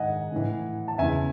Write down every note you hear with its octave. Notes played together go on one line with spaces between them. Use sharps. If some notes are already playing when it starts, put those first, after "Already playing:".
Already playing: G#2 D#3 D#5 F#5 G#5
A2 E3
A5
E2 C#3 E3 E5 G#5